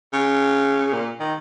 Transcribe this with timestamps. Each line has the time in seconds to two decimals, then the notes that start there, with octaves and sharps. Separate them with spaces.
0.13 C#3
0.93 A#2
1.20 D#3